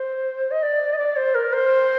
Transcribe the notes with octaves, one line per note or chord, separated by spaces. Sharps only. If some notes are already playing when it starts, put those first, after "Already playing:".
Already playing: C5
D#5
D5
D#5
D5
C5
A#4
C5